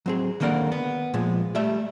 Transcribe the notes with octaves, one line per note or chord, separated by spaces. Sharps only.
F#3 C4 G#4
D3 D#3 A#3 A#4 D5 F#5
B3
A#2 F3 G#3
G3 A3 E5